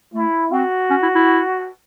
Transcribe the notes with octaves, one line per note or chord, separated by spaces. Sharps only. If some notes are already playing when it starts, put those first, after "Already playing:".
A3 E4
C4 F#4
C#4
E4
E4